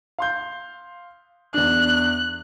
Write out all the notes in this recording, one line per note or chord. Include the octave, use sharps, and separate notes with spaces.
F5 C6 G6
E2 D4 F#6